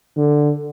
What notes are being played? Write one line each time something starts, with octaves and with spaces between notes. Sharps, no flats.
D3